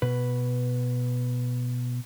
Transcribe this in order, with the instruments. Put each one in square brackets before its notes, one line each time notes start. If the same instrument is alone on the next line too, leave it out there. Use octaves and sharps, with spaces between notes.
[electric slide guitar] B2 B4